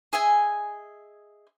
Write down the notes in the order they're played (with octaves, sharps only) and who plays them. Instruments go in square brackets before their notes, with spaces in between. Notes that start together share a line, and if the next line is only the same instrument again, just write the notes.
[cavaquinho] G#4 D#5 E5 G#5